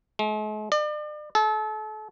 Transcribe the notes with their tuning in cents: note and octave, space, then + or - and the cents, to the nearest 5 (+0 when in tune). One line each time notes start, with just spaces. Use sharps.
G#3 +45
D5 +40
A4 -35